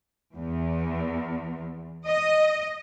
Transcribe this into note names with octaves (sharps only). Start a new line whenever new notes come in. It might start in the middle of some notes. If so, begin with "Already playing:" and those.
E2
D#5